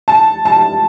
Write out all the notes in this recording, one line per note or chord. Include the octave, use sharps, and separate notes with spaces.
A5
A5